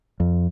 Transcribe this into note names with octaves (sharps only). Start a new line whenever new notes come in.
F2